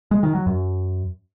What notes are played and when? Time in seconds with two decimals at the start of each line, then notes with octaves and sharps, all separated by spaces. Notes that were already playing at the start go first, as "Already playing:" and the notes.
0.11 G#3
0.23 D#3
0.35 F#3
0.46 F#2